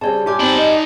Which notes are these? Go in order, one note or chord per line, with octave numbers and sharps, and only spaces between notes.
C#3 G3 C4 C#5 A5
G2 F4 G4 G#5 D6 F6
C4 D#4 D5 A5 B5
D#5